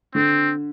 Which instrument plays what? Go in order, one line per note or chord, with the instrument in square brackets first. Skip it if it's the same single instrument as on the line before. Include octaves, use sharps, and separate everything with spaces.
[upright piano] D3 [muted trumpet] C4